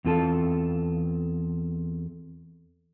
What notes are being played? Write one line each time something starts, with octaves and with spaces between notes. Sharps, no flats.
E2 C4 F4 A4 A5